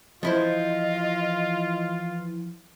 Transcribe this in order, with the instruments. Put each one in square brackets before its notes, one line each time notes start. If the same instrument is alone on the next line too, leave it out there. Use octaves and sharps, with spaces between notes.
[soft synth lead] E3 [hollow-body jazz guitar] F3 E4 C5 [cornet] F4 [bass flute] D#5